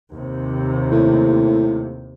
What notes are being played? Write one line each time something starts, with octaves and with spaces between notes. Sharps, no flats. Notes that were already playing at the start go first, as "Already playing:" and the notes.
D#2 C3
A2